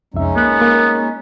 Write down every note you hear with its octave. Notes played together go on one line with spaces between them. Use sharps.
C2 F2 G#3 C#4 D#4 E5
A#3 B3 F#6
A#3